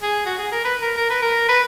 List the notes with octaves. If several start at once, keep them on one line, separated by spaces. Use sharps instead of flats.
G#4
F#4
G#4
A#4
B4
A#4
A#4
B4
A#4
B4